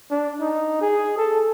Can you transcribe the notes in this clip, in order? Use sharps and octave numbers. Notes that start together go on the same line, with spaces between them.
D4
D#4
G#4
A4